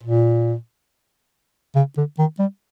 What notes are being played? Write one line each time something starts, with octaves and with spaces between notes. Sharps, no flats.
A#2
C#3
D3
D#3
G3